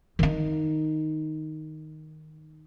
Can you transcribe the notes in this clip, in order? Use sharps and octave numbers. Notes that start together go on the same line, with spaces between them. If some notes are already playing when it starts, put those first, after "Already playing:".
D#3 D#4